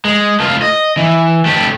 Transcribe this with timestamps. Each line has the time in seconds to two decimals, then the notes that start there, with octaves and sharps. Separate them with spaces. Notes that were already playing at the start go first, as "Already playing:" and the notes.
0.05 G#3
0.40 A3 F4
0.62 D#5
0.97 E3
1.46 A3 G4